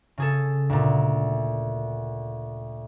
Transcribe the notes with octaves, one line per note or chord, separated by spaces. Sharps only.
C#3 G#4 A4
D2 A#2